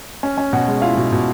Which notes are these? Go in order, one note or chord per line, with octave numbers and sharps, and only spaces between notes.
C#4
C#4
B2 F#4 F#5
G#3
E4 F4 F5
B2
B2